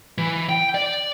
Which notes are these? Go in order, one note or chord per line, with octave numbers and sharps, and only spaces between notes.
E3
G5
D5